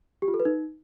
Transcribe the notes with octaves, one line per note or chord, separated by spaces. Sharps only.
G4
F4
A4
B4
D#4